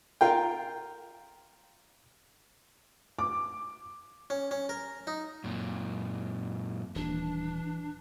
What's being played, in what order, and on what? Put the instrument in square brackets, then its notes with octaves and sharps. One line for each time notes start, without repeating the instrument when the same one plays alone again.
[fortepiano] F4 A#4 G5
[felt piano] D6
[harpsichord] C#4
C#4
A#4
D#4
[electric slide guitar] F#2 A#2
[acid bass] D#1 [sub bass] E3 [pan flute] D4